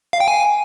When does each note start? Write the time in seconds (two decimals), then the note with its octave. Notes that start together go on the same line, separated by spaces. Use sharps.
0.13 F5
0.20 G5
0.28 G#5